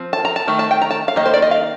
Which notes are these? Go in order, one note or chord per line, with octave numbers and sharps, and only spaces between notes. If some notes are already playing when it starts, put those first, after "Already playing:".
Already playing: F3 C4
A5
A#5
A5
D#3 A3
A5
G5
A#5
A5
F5
D#3 A#3 D#5
C5
D5
D#5
F5